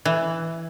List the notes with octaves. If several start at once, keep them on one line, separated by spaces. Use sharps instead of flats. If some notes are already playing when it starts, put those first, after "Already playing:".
E3